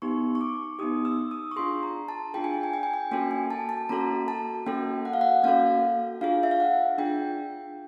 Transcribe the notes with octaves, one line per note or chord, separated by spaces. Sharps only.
B3 D#4 G4 C#6
C#6
D6
B3 D#4 G4 D#6
E6
D#6
C#6
D4 F4 G#4 C6
A#5
A5
D4 F4 G#4 G5
G#5
G5
G#5
G5
G#5
G5
A#3 C#4 F#4 A4 G5
G#5
A5
A5
A#3 C#4 F#4 A4 A#5
A5
A#3 C#4 F#4 A4 G5
F#5
F5
F#5
A#3 C#4 F#4 A4 F5
D4 F4 G#4 F5
E5
F5
F#5
D4 F4 G#4 G5